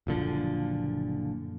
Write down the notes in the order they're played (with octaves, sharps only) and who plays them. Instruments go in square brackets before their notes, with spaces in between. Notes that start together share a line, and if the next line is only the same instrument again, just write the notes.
[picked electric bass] F#1 A#2 D3 F3